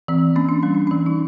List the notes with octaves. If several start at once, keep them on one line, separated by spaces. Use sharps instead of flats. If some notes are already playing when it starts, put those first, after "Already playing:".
E3 C4
A#3 C#4
D4
G3 C#4
D4
E3 C#4
D#4